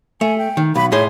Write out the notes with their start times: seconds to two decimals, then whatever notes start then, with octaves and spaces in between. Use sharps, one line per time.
0.21 A3 G#5
0.38 G5
0.57 D#3
0.75 B1 B5
0.92 A2 G#4 C5 C#5